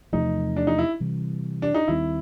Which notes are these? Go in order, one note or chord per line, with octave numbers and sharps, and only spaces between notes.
E2 C3 F3 A3 D#4
D4
D#4
E4
C3 E3 G3
D4
D#4
D#2 D#3 G3 C4 E4